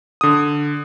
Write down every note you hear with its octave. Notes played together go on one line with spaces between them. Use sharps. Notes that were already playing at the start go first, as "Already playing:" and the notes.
D3 D#6